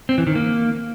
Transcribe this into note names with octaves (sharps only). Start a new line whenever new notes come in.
C4
E3
D#3
A#3